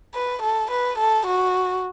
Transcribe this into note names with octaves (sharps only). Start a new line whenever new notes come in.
B4
A4
B4
A4
F#4